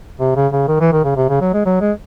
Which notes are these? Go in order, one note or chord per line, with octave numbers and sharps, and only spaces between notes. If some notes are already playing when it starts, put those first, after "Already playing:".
C3
C#3
C#3
D#3
E3
D#3
C#3
C3
C#3
F#3
G#3
F#3
G#3